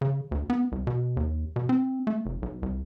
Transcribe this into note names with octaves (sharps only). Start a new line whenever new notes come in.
C#3
D2
B3
C2
B2
D#2
B2
C4
A3
F1
B1
C2